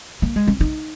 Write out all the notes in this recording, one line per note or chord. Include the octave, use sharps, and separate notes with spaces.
A#3
G#3
C#4
D#4